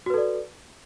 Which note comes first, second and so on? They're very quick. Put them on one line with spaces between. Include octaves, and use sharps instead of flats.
F#4 B4 A4 D5